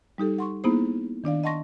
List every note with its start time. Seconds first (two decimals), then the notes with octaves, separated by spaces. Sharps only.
0.18 G3 D#4 G4 A4
0.38 F#5 C6 C#6
0.64 A#3 B3 D#4 E4 G#4 C5
1.24 D#3 D4 D5 F5
1.44 D#5 F#5 A5 C6 C#6 A#6